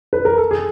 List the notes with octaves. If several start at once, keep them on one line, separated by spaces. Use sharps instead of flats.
B4
A#4
A4
G#4